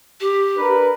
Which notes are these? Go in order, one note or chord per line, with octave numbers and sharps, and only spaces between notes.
G4
D4 A#4 B4